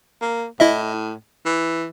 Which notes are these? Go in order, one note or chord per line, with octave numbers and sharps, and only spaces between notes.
A#3
A2 E4 D#5 E5
E3